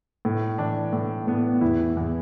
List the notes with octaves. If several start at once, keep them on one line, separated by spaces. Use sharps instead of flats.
A2
E3 D4
A2
A2 B3
E2 E4
E2